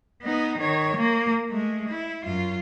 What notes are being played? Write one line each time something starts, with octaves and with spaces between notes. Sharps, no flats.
B3 D#4
D#3 C#5
A#3
G#3 A3
E4
F#2 F4